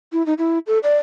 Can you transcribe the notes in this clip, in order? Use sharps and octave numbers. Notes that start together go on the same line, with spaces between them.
E4
D#4
E4
A4
D5